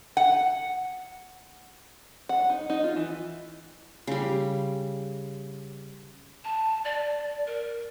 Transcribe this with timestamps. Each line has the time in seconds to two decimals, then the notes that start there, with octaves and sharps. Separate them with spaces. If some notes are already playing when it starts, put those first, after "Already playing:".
0.17 F#5
2.29 F#5
2.50 D#4
2.70 D#4
2.84 F4
2.96 E3
4.07 C#3 G3
6.44 A5
6.85 D5
7.47 A#4